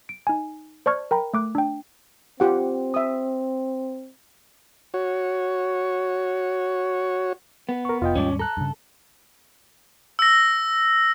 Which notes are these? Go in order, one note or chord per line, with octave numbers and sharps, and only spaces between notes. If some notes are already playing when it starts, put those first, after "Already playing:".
D7
D#4 G#5
C5 D5 A5 C#6 F6 G#6
A#4 G5 A#5 B5
A3 D6 F#6
D4 G5
C4 F4 G4 F#5
E5 D#6
F#4 C#5
B3
A#4 C#6
F1 F4 D#5 G5
D#2 G#2 G3 C#4 D5
A4 A#5 F#6
G2 C#3
E6 A#6